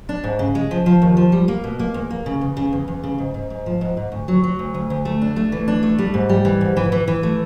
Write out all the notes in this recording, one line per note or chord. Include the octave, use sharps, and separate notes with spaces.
D4
G#2
C#3
G#3
F3
F3
D#2
F3
G3
A#3
B2
A#3
E2
A#3
C#3
E2
C#3
E2
E2
C#3
G#2
G#2
G#2
F3
G#2
G#2
D2
F#3
F#3
D2
D2
D2
A3
D4
A3
E3
D4
A3
G3
G#2
G3
E3
G#2
E3
E3
E3
A3